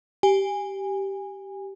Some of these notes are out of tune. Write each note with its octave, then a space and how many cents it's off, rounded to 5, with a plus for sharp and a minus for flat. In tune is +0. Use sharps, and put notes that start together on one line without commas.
G4 -10 G#5 -20